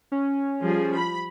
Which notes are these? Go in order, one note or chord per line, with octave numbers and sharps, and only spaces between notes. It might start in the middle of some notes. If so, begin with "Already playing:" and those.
C#4
F3 G3 G#4
B5